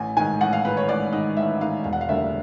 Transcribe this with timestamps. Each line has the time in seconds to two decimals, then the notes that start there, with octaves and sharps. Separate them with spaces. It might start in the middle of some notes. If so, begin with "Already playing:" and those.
Already playing: A1 G#5
0.17 G#2 D#3 G#5
0.41 A1 F#5
0.53 F5
0.65 G#2 D#3 B4
0.77 C#5
0.88 A1 D5
1.12 G#2 D#3 D#5
1.37 A1 E5
1.61 G#2 D#3 F5
1.84 E1 F5
1.93 F#5
2.01 F5
2.09 D2 D3 G3 A#3 E5